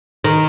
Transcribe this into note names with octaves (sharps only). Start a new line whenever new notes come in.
D#3